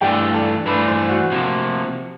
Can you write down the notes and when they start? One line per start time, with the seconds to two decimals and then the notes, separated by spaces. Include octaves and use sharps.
0.01 G2 E3 A3 D4 F4 G4 G5
0.34 A4 A5
0.66 G2 E3 A3 D4 F4 B4 B5
0.88 C5 C6
1.09 F#4 F#5
1.31 C3 F3 A#3